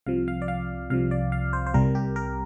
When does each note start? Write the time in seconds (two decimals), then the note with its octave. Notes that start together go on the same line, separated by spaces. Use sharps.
0.06 C2 C3 F3 F5
0.28 F5
0.42 D5
0.48 F5
0.90 C2 C3 F3 F5
1.11 D5
1.32 F5
1.53 C5
1.66 C5
1.74 C2 C3 G3 A#4
1.95 G4
2.16 A#4